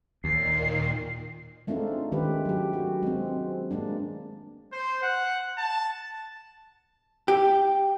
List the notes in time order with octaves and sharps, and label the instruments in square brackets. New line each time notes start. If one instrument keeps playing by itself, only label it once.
[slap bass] D#2 [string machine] A#2 D#3 [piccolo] C7
[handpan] G#3 A3 C4 D4 D#4 F4
D#3 G#3 C#4 G4 B4
F#3 G4
F#4
G#3 C4
G#3 A#3 D4
[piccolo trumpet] C5
F#5
A5
[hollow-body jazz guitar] G4